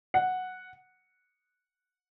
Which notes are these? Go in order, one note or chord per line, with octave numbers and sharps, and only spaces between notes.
F#5